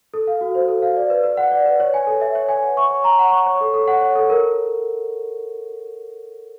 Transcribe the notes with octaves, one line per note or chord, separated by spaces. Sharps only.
A4
F5
F#4
C5
A4
F5
D5
B4
B4
F#5
D5
B4
C#5
G#5
A4
E5
C#5
G#5
F#5
C#6
C#5
A#5
F#5
C#6
C#5
A4
A4
F#5
C#5
A4
A#4